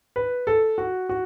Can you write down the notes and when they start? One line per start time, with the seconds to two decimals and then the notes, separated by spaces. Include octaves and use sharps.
0.16 B4
0.47 A4
0.78 F#4
1.09 F#4